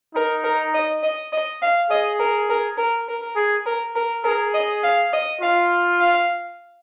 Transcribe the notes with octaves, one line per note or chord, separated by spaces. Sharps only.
D#4 A#4
A#4
D#5
D#5
D#5
F5
G#4 D#5
A#4
A#4
A#4
A#4
G#4
A#4
A#4
G#4 A#4
D#5
F5
D#5
F4 F5
F5